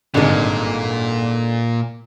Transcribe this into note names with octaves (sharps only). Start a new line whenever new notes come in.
G#1 G2 A#2 D3 G#3